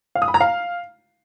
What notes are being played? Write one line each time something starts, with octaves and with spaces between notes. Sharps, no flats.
F5
D#6
B5
A#5
F5